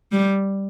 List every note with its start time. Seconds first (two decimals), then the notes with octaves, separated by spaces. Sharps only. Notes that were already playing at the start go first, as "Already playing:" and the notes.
0.12 G3